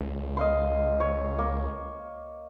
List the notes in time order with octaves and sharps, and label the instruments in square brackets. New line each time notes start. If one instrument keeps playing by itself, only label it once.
[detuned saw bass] C#2
[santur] D#5 F5 C6
C#5
A#3